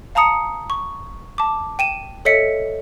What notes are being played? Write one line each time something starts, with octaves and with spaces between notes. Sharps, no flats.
F5 A5 A#5 D#6 C#7
C#6
A5 D6
G5 D#7 E7
A4 C#5 D#5 E5 B6 C#7